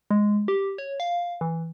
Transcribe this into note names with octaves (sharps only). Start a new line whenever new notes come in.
G#3
G4
C#5
F5
E3